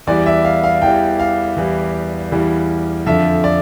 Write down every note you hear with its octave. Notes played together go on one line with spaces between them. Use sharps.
E2 E3 G3 D5
E5
F5
F5
E2 E3 G3 G5
F5
E2 E3 G3
E2 E3 G3
F2 D3 F3 E5
D5